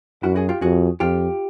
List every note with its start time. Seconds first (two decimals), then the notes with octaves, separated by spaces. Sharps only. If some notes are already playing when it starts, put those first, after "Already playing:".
0.23 F#2 E4 F#4
0.36 F#4 G#4
0.49 F4 G4
0.62 F2 F#4 G#4
1.00 F2 F4 G4